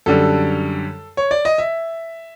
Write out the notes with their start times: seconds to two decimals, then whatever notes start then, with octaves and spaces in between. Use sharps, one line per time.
0.06 F#2 D3 G3 A4
1.17 C#5
1.31 D5
1.45 D#5
1.58 E5